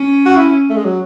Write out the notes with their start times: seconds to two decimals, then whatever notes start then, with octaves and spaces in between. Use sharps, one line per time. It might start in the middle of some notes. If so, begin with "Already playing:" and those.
Already playing: C#4
0.26 F#4
0.37 E4
0.70 A3
0.77 G#3
0.85 F#3